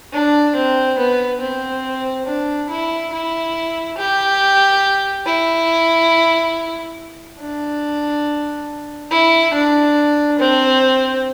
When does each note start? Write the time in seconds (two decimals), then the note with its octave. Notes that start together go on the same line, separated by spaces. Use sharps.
0.12 D4
0.55 C4
0.98 B3
1.40 C4
2.26 D4
2.69 E4
3.12 E4
3.97 G4
5.26 E4
7.40 D4
9.11 E4
9.53 D4
10.39 C4